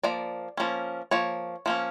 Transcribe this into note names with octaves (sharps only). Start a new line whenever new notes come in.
F3 A#3 D5
F3 A#3 C#4
F3 A#3 C#5
F3 A#3 C#4